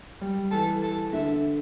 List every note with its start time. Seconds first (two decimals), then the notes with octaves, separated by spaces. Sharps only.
0.21 G3
0.51 E3 A4
0.82 A4
1.13 D3 E5